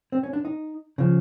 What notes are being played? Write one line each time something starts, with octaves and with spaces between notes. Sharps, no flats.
C4
C#4
D4
D#4
C#3 F3